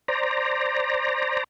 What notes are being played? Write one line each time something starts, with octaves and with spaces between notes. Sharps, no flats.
C5 D5 A#5